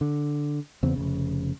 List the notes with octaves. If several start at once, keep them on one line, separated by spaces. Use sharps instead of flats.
D3
E2 C#3 B3 C4
F1 E2 C#3